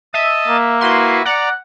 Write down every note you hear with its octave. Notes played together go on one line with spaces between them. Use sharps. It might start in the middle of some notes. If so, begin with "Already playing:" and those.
D#5 E5 A5 D#6
A#3
E4 F#4 B4 C6
D5 F#5 A#5